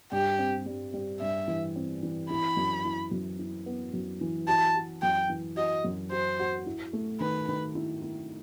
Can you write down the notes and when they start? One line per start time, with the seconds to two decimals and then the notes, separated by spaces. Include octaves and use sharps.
0.12 G2 G4
0.39 C4
0.66 G3
0.94 G3
1.21 G2 E5
1.48 E3
1.76 C4
2.03 E3
2.30 E4 B5
2.57 F#2
2.85 E4
3.11 F#2
3.39 E4
3.66 B3
3.93 F#2
4.21 E3
4.48 F#4 A5
4.76 F#4
5.02 F#2 G5
5.30 E3
5.57 F#4 D#5
5.84 F#2
6.12 F#4 C5
6.40 F#4
6.67 E4
6.93 A3
7.20 D#3 B4
7.49 D#3
7.75 E4
8.02 E4